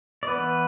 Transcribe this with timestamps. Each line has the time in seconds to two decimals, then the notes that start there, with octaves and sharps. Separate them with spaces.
0.23 D5
0.27 E3 B3 B4